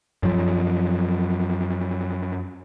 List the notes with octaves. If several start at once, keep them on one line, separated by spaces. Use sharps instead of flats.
F#2 F3